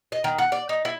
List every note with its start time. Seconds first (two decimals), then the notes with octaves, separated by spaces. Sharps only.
0.12 D#5
0.24 D#3
0.38 F#5
0.52 D5
0.69 D#4
0.85 E4